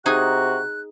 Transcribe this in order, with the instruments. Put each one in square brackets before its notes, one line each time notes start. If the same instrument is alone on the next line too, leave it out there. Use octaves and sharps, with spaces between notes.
[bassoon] C3 [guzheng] D#4 G#4 G#5 [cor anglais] F#4 [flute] F#6